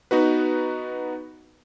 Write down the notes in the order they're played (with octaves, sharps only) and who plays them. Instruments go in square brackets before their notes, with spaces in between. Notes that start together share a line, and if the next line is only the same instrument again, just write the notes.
[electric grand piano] B3 D#4 F#4 B4